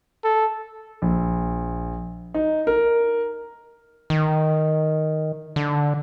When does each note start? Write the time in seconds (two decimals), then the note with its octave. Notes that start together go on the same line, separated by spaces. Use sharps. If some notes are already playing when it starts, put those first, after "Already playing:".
0.24 A4
1.02 A#1
2.34 D#4
2.67 A#4
4.10 D#3
5.56 D3